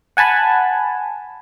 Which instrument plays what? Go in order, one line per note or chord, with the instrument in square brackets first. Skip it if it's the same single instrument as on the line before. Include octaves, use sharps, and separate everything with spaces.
[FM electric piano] F#5 G#5 A5 B5